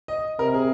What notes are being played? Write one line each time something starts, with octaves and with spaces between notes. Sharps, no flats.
D#5
C3 A#4
G#4